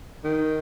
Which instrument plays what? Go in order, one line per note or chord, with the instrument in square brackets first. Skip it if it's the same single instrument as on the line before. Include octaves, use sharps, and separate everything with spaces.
[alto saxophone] D#3